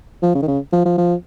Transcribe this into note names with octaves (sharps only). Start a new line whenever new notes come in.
F3
C#3
D#3
C#3
F3
F3
F3